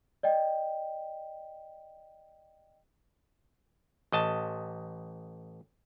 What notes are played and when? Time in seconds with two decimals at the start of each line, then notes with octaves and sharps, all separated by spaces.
0.23 D5 D#5 G5
4.12 A1 D#5 A5